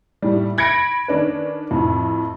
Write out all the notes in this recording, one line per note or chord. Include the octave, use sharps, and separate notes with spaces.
A2 G3
B5 G#6 A#6 C#7 D7
D#3 C#4 D4 B4
F2 A2